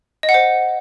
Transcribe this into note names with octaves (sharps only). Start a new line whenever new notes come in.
D#5
F#5
C5